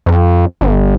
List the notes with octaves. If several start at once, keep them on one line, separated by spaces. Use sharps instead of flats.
F2
G1